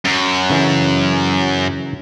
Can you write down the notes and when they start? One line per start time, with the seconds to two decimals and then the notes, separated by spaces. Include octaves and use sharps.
0.05 F#2
0.49 C#3 E3 C#4